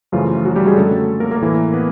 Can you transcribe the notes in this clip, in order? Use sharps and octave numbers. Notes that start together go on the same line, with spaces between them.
F#2 C#3 E3 F3 A3 F4
F#3 F#4
G3 G4
G#3 G#4
F#2 D3 F#3 A3 A4
A#3 A#4
A#3 A#4
A2 E3 A3
B3 B4